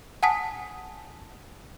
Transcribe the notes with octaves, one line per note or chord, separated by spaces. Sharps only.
F#5 G#5 A5 D#6 B6